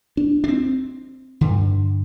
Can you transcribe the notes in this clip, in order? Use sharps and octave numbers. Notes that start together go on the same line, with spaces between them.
D4
D4
C4
G2 D3